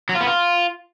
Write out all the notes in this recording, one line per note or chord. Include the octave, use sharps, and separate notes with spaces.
F#3
F4
B3
F4